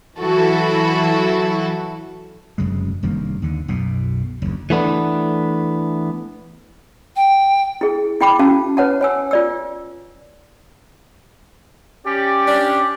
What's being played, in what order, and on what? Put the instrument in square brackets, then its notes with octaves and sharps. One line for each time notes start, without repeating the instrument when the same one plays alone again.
[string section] E3 F#3 E4 F#4 A4
[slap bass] F1 F#2 C#3 G#3
F1 G2 D#3 A#3
D#2 D3
B1 F#2 B2
F#1 D2
[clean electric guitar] E3 A3 B3 D4
[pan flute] G5
[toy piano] E4 G#4
E4 G5 B5 D6
C#4 F#4 F5 A5
B4 C#5 F#5 A5
C#5 G#5 E6
F4 D5 E6
[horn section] C#4 G4 D5
[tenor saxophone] D4